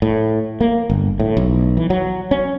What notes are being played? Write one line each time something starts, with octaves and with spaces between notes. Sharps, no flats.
A2
A#3
G1
A2
B1
E3
F#3
C#4